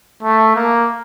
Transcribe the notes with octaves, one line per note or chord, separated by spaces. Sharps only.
A3
A#3